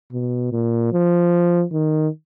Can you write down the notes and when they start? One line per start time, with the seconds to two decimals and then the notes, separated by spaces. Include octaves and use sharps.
0.12 B2
0.52 A#2
0.92 F3
1.72 D#3